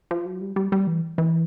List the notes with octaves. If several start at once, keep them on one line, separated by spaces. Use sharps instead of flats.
F3
F#3
G3
G3
G3
E3
E3